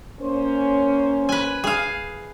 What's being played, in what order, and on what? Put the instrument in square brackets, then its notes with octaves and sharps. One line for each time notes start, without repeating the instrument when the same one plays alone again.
[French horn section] A#3 C#4 C5
[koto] B4 G#5
G#4 F5